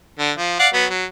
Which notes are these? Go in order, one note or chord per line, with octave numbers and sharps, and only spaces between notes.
D3
F3
D5 F5 F#5
F#3 B3
F#3